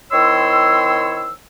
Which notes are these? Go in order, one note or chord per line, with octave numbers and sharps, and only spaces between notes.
D#3 C4 E4 C#5 C6 E6